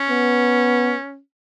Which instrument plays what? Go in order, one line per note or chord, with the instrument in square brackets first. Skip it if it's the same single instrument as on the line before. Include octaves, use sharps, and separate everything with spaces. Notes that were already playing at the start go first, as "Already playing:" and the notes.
Already playing: [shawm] C#4
[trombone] B3